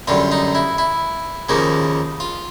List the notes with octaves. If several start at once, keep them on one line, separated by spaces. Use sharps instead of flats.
F#2 D3 G3 F4
D#4
E4
E4
D#2 C#3 F3 A#3 D#4
F4